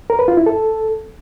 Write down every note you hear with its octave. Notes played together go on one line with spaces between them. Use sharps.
A#4
B4
F4
E4
A4